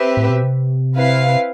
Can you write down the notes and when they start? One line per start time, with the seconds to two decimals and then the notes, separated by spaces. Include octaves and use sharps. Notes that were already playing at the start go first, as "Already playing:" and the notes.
Already playing: C4 G4 B4 E5
0.17 A2
0.30 B2
0.44 C3
0.95 C4 E4 B4 F5